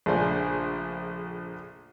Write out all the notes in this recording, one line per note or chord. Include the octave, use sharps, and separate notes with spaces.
A#1 C#3 A3 D4 C5 G#5